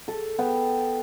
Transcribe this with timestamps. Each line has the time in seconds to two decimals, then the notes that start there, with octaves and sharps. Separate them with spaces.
0.08 A4
0.39 B3 G5